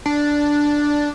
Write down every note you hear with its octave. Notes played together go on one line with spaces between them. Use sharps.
D4